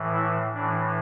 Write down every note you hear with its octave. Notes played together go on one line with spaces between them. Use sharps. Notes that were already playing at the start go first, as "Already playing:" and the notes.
Already playing: A2 E3
E4
A2 E3 D4